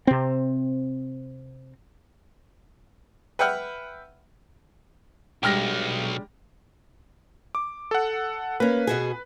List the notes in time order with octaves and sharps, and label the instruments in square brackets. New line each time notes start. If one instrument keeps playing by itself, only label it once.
[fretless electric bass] C3 C4
[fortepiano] B4 E5 F#5 G5 B5 F6
[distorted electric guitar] B1 [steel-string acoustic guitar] G3 G#3 D4 [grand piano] G5 F6 A#6
[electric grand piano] D6
A4 F#5
[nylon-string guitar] A#3 C#4 [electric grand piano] B4
[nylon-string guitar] B2 F#4 G#4